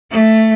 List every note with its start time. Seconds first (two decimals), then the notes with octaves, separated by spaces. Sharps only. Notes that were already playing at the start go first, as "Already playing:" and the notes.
0.11 A3